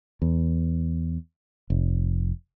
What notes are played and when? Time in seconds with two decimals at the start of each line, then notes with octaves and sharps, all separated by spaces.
0.22 E2
1.70 F1